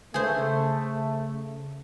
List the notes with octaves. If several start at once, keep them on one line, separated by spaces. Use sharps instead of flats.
C#3 A3 G#4 C5